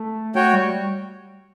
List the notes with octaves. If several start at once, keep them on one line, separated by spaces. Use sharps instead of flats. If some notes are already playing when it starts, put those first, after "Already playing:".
Already playing: A3
A3 F#4 C#5 G5
G3